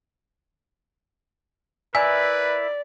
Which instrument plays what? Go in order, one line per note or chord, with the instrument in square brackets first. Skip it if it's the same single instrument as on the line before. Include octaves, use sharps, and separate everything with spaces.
[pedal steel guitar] E4 A#4 E5 [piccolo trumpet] B4 [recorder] D5 [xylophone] G#5